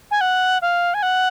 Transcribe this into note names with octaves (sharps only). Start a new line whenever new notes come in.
G#5
F#5
F5
G#5
F#5